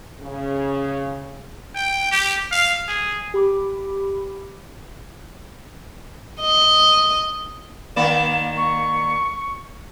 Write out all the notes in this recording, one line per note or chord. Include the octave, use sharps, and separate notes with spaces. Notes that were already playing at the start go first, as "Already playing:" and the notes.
C#3
G5
G4
F5
G#4
G4 B5 D6
D#5
D#3 A#3 D5 E7
C#6